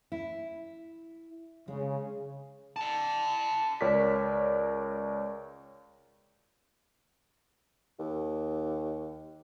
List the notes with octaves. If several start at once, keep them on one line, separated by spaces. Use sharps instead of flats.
E4
C#3 G#3
F#5 A5
C#2 A#4 C#5 D5 B6
D#2